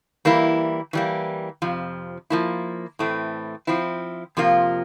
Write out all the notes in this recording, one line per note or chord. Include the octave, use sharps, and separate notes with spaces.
E3 G3 A#3 E4
E3 G3 A#3
F2 C3 F3
F3 A#3 E4
A2 E3 A3 C4
F3 C4 E4
F2 C3 F3 A#3 F4